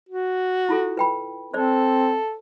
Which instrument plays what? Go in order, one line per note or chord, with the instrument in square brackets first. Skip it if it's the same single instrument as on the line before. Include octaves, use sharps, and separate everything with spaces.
[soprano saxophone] F#4
[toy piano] E4 F4 A4
B4 G5 B5
[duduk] C4 [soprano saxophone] A4 [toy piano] C5 D5